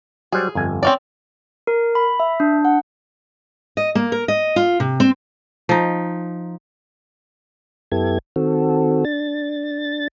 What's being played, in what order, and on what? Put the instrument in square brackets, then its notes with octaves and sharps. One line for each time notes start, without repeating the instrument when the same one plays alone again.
[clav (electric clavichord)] F#3 G3 C5 [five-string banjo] G#4
[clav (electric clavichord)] G1 F2 G#5
[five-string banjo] C4 C#4 D5
[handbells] A#4
B5
E5
D4
F#5
[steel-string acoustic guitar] D#5
A#3
A#4
D#5
F4
C3
C4
[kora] F3 D#4
[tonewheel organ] F#2 B3 E4 G4 A4 G#6
D#3 C4 F#4 A4
D4 A6